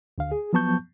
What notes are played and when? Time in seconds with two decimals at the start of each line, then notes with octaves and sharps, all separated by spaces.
0.18 D2 D3 F5
0.32 G#4
0.53 F3 F#3 B3 A5 C#6 G6